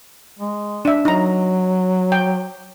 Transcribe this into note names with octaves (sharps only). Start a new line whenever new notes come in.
G#3
D4 E5
F#3 D#4 A#5
G5